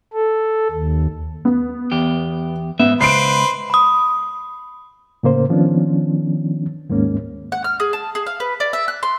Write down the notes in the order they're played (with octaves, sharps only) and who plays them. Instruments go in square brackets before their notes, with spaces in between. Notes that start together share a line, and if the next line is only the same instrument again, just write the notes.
[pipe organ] A4
D#2
[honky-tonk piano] B3
[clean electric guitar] E2 G4
[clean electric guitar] G#2 E5 [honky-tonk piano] B3
[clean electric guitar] C#2 [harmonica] B4 C5 [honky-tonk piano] C7 D7
[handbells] B5 D#6
[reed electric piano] A2 C#3 A#3 C5
D#3 F3 B3 C#4 D4
D#2 G#2 G#3 A#3 C#4
[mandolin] F#5
F6
G#4
A5
G#4
F5
B4
D5
E5
F#6
C6